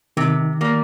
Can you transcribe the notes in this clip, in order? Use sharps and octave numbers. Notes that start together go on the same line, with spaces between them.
C3 D#3
G3 A#3